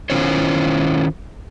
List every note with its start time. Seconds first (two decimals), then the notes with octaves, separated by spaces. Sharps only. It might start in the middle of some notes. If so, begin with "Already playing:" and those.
0.10 D#3 C#4 E4 F4 C5 C#5